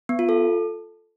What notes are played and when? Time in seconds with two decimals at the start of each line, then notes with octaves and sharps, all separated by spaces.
0.09 B3
0.19 F4
0.29 A4